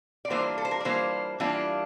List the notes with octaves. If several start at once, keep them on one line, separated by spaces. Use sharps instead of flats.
D5
E3 G3 A#3 D4 F4 C5
A4
C5
A#4
D5
E3 G3 A#3 D4 F4 C5
E3 G3 A#3 D4 F4